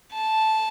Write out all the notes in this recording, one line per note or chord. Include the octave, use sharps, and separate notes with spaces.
A5